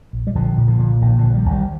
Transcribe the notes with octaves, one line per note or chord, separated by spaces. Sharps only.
A#1
G3
A#1 D3 F3
A#2
D3 F3
A#2
A#1 D#3
D3 F3
A#1
D#3 G3
A#1
D#3 G3